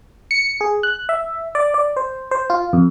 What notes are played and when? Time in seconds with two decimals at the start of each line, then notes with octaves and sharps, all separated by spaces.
0.31 C#7
0.61 G#4
0.83 F#6
1.09 E5
1.55 D5
1.74 D5
1.96 C5
2.31 C5
2.50 F4
2.73 F2